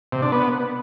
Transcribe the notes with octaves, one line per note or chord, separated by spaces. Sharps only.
C3
D4
B3